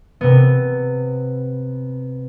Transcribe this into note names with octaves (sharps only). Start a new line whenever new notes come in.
C3 B3